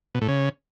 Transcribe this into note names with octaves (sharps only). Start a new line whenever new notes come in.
B2
A2
C#3